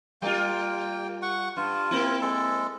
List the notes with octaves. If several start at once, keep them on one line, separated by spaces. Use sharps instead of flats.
G3 A#3 F4 G5
F#5 C#6
G2 F4
A#3 C4 E4
G#3 A4